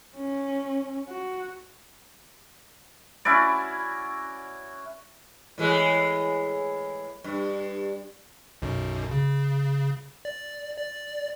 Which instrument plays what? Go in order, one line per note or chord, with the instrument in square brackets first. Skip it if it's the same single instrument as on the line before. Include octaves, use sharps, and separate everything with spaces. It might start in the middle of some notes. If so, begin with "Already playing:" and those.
[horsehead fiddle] C#4
F#4
[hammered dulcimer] C#4 E4 F#4 D5
[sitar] A2 E3 G#3
G2
[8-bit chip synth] B1 F#2 B2
C#3
D5
D5